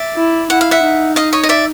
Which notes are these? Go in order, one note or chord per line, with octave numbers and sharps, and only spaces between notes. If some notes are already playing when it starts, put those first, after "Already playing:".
Already playing: D5 E5
E4
E4 F#5
F5
E5 F#5
D#4
D#5 F5
C#5 D#5
D#5
D5 E5